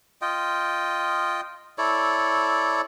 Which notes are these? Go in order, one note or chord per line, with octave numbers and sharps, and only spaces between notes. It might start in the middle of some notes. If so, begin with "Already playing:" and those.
F4 D#5 G5
E4 A4 C#5 D5